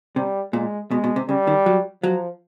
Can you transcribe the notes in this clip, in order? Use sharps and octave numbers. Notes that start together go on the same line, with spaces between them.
C3 G3
A#2 G#3
B2 G#3
B2
C3
C#3 G3
D#3
F#3
F3 F#3